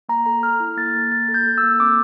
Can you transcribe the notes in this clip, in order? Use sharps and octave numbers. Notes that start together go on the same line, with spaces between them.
A#3 A#5
A4 A#5
A4 F6
E4
A#3 A6
A#3
A#3 A6
A4
G6
A4
E6
A#3
C4 D6